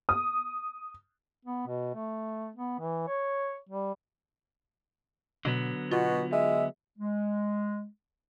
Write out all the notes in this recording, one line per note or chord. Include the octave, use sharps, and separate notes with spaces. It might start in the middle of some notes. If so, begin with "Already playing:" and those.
D#6
B3
B2
A3
B3
E3
C#5
G3
B2 D3 F#3 B3
B2 F4 F#4
G#3 E5
G#3